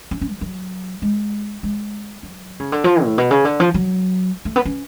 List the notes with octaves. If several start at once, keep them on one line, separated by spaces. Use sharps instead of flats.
C#4
C#4
F#3
F#3
G#3
G#3
F#3
C#3
D3
F3
A2
B2
C#3
D3
F3
F#3
A3
B3
C#4